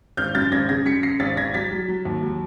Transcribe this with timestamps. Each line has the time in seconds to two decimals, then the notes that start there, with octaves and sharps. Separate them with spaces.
0.17 G#1 F6 G6
0.34 F#2 G6 A6
0.52 G#1 G#6 A#6
0.69 C#3 G#6 A#6
0.86 F#2 B6 C#7
1.03 C#3 A#6 C7
1.20 G#1 A6 B6
1.37 G#1 G#6 A#6
1.54 F#3 A6 B6
1.71 F#3
1.88 F#3
2.05 D#2
2.23 F#3